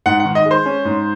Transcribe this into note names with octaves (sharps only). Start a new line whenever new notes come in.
G#2 F#5
F#5
D#3
D#5
G#3
C5
C#4
G#2